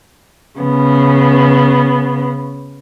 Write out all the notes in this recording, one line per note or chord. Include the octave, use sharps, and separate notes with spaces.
C#3 B3